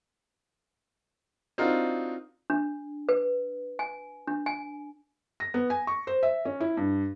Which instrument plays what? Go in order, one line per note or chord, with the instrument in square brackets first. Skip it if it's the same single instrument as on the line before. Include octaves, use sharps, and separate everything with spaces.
[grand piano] C4 D4 D#4 F4 F#4 A#4
[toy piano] D4
B4
G#5
D4
G#5
[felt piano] A#6
B3
G#5
C#6
C5
E5
C#4
E4
G2